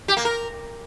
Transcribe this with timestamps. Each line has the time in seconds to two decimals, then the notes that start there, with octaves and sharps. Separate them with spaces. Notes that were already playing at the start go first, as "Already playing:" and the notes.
0.08 G4
0.17 A#3
0.25 A#4